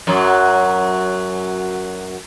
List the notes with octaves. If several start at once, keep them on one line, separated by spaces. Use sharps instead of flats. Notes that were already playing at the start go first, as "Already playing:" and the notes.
F#2 F#3